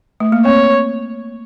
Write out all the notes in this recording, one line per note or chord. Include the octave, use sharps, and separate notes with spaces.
A3
A#3
C4 C#5